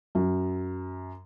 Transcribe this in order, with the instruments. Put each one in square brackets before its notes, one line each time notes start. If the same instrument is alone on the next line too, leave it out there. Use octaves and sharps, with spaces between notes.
[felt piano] F#2